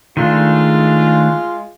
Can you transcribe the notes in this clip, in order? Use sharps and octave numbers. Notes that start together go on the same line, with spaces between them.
D#3 G#3 A3 D4 F4